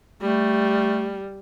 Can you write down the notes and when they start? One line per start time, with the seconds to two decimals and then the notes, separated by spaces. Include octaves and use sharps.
0.22 G3 A3